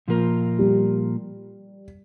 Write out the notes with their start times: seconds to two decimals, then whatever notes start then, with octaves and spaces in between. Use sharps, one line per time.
0.08 A#2 F3 A#3 F4 A#4
0.59 G3